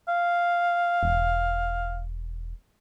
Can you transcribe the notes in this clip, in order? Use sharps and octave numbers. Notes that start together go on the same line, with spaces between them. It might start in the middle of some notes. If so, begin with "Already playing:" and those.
F5
E1